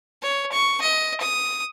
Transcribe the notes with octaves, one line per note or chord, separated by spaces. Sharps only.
C#5
C#6
D#5
D#6